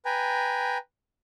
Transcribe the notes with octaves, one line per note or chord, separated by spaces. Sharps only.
B4 G5 G#5 A#5